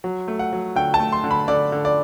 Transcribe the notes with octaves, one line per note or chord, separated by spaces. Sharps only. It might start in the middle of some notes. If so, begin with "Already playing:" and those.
F#3
A3
F#5
F#3
D3 G5
A5
A3
C6
D3
B5
D3 D5
D3
D5